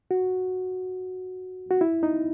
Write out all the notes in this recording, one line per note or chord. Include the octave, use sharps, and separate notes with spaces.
F#4
F#4
E4
D#4